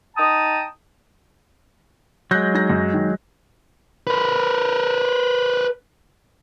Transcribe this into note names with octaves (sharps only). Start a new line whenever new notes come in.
D#4 G5 A5 A#5 D#6
F#3 G#3 F#6 G6 A#6
D#4 A#6
F#2
D#3
A#4 B4